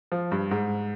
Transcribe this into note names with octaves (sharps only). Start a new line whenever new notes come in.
F3
G2
G#2